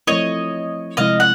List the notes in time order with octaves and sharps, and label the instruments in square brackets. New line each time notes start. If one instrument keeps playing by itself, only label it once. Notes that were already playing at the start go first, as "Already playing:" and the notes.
[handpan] F3 A3 C4 E4 [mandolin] C#5 D#5
[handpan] C3 F3 G#3 C4 E4 [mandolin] D#5 F5
[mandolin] F#5